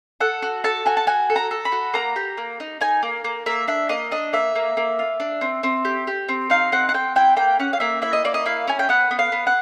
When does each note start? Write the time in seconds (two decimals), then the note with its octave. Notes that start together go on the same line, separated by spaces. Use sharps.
0.20 A4 F#5
0.42 F#4
0.64 A4 A5
0.86 F#4 G#5
0.97 A5
1.07 F#4 G#5
1.30 A4
1.36 A#5
1.51 A4
1.65 B5
1.72 F#4
1.94 A#3 A#5
2.16 G4
2.37 A#3
2.60 D#4
2.81 D#4 G#5
3.03 A#3
3.24 A#3
3.46 A#3 E5
3.68 D4 E5
3.89 A#3 D#5
4.11 D4 D#5
4.33 A#3 E5
4.55 A#3
4.77 A#3
4.99 F4
5.20 D4
5.41 C4
5.63 C4
5.85 G4
6.07 G4
6.29 C4
6.50 D#4 F5
6.72 C4 F#5
6.89 F#5
6.94 C4 G5
7.16 E4 G5
7.36 A#3 G5
7.59 C#4 F#5
7.73 F5
7.80 A#3 E5
8.02 E4 E5
8.13 D#5
8.25 A#3 D5
8.34 D#5
8.46 E4 F5
8.67 C#4 G#5
8.79 G5
8.89 B3 F#5
9.11 B3
9.19 F5
9.32 B3
9.47 F#5